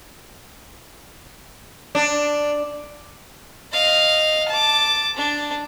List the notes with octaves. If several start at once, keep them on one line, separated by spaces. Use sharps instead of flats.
D4
D#5 F5
A5 D6
D4